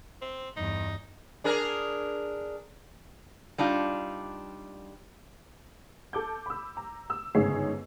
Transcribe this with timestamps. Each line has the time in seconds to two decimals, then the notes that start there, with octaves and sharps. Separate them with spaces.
0.22 C4
0.57 E2 G2 D#4
1.44 D4 G#4 A#4
3.58 G3 D4 D#4 F4
6.13 A4 D6 G6
6.46 B5 E6
6.77 A#5
7.10 E6
7.35 G1 G#2 C#3 G#4 C#5 C7